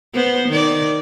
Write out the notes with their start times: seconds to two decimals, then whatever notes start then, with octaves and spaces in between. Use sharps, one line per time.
0.13 B3 C5
0.48 D#3 D5